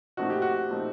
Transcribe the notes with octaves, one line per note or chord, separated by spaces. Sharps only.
A#2 A3 C4 D#4 F#4
G4
F#4
A#2 A3 C4 D#4